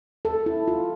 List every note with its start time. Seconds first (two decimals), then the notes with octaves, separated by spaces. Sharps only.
0.25 A4
0.46 E4
0.68 F4